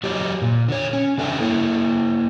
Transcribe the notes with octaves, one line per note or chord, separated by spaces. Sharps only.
F#3 F#4 G4 C#5 D#5
A#2
D3 C#5
C#4
C#3 D4 A4 E5 G5
A#3 E4 C#5